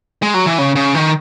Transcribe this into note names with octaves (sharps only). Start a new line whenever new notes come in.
G#3
F#3
E3
C#3
C#3
D#3